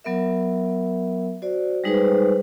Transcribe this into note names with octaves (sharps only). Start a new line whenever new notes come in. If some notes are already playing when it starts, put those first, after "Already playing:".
F#3 B3 A#4 E5
F#4 C5 D5
G3 G#3 D#4 G#4 B4 C5